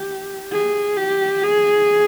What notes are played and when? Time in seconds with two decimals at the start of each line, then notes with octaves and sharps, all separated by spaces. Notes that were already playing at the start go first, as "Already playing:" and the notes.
Already playing: G4
0.52 G#4
0.96 G4
1.43 G#4